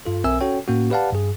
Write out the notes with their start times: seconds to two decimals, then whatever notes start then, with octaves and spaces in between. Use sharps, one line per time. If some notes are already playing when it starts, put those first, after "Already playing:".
0.06 G2 F4 A4
0.24 B1 C4 A#4 E5 G#5 E6
0.41 C#4 F#4 A4 C#5 G5
0.68 A2 A#3 C#4 F#4
0.90 G4 B4 D5 F5 F#5 A5
1.13 G2 G#4